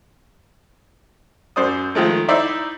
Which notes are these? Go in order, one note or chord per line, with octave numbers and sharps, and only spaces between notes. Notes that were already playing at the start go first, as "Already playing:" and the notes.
F#2 C5 D5 D#6
D#3 F3 G#3 A3
D#4 E4 C5 D5 E5